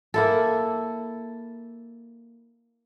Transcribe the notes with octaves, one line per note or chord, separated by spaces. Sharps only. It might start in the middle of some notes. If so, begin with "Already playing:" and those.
A#3 E4 A4